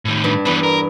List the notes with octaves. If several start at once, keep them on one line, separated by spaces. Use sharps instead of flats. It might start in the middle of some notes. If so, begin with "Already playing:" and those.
A2 D#3
G2
E2 B3 D4 B4
A#4